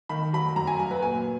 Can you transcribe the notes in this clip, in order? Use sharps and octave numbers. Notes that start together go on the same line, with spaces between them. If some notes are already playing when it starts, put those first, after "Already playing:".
D#3 B5
F#3 B5
F#2 A#5
G#5
F#3 A#5
B4
A#2 G#5